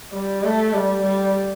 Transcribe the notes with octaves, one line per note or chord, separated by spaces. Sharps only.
G3
A3
G3
G3